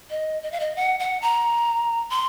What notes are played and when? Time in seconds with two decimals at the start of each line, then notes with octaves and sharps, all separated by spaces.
0.10 D#5
0.43 D#5
0.52 F5
0.60 D#5
0.76 F#5
1.00 F#5
1.22 A#5
2.10 C6